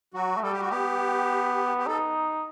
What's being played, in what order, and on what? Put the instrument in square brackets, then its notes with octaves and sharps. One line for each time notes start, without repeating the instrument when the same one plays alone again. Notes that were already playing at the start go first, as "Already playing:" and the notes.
[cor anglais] F#3 [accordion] F#4
[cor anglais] A3
[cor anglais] G3 [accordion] A4
[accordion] G4
F#4
[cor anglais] B3 [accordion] G4
[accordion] G4
[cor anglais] D#4 [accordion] A4